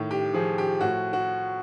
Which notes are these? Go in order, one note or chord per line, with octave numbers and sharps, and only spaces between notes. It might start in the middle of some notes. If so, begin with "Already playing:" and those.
Already playing: A2 D#3
G4
F3 G#4
G4
A2 F#4
F#4